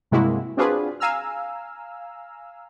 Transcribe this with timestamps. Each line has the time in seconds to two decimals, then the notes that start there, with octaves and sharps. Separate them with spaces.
0.11 G2 C3 G#3 A#3 E4 F#4
0.57 C4 D4 F4 F#4 G#4 B4
1.00 F5 G#5 A#5 E6 F6